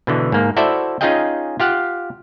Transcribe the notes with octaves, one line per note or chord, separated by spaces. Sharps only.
B2 D3 E3
G#2 A#3
E4 F#4 A4 C5 D5 E5
C#4 D#4 F4 G#4 D#5 G5
F4 G4 F5 F#5